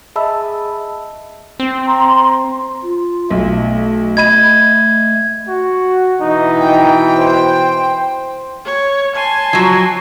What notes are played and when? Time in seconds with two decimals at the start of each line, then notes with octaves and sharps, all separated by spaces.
0.16 G#4 D#5 E5 A5 B5 E6
1.60 C4
1.86 A#5 C6
2.82 F4
3.31 B1 A3
4.17 D#5 B5 G#6 D#7
5.47 F#4
6.21 B2 E3 D#4
6.60 G5
7.18 C5
8.66 C#5
9.16 G#5 A5 C6
9.53 F3 F#3